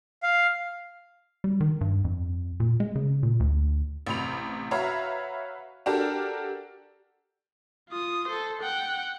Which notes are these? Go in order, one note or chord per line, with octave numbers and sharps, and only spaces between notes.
F5
G3
D#3
G2
F2
A#2
G#3
C#3
A#2
D2
A1 C3 B5 F7
F#4 B4 C#5 E5 F5 A#5
D4 F#4 G4 A4 A#4 D5
F4 D#6
A4 C5
F#5 G5